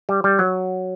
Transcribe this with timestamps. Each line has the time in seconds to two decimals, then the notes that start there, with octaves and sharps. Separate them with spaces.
0.09 G3
0.24 G3
0.39 F#3